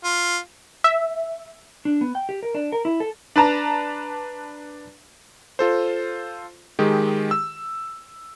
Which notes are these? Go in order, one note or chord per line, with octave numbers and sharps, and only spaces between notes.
F4
E5
D4
B3
G5
G4
A#4
D4
A#4
E4
A4
D4 B4 A5 A#5
F4 A4 C5
D#3 G#3 G4 G#4
E6